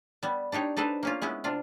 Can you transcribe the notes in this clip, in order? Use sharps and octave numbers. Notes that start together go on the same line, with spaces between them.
G3 B3
D4 D#4 G4 C#5
D4 D#4 A4 B4 C5
A#3 C#4 F4
G#3 B3 C#4 E4
C3 D4 F4